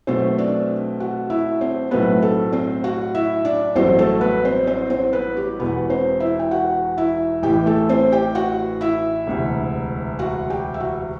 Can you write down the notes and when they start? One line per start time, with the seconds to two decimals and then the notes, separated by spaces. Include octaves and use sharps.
0.07 B1 B2 A3 C4 C5
0.38 D4 D5
1.00 F#4 F#5
1.30 E4 E5
1.61 C4 C5
1.91 B1 A2 F#3 A3 B3 C4 B4
2.22 A3 A4
2.52 C4 C5
2.84 F#4 F#5
3.14 E4 E5
3.45 D4 D5
3.75 A1 G2 F#3 A3 C4 C5
3.99 A3 A4
4.21 B3 B4
4.45 C4 C5
4.67 C4 C5
4.90 C4 C5
5.13 B3 B4
5.37 G4
5.59 E1 E2 B2 B3 B4
5.89 C4 C5
6.20 E4 E5
6.39 G5
6.51 F#4 F#5
6.98 E4 E5
7.43 A1 A2 E3 G4 G5
7.66 A3 A4
7.89 C4 C5
8.12 G4 G5
8.35 F#4 F#5
8.81 E4 E5
9.27 E1 D2 C3
10.19 F#4 F#5
10.50 G4 G5
10.74 E5
10.80 F#4 F#5